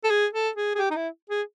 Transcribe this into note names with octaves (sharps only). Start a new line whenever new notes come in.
A4
G#4
A4
G#4
G#4
G4
D#4
E4
G#4